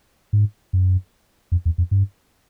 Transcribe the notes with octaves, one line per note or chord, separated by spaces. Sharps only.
G#2
F#2
F2
E2
F2
G2